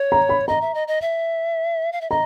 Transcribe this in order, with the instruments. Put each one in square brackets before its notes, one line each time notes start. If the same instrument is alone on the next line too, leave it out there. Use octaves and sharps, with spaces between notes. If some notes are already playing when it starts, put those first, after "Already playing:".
Already playing: [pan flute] C#5
[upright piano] A#5
B5
[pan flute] D#5 [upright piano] A#5
[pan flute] E5
D#5
D#5
E5
F5
E5
[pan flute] D#5 [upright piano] A#5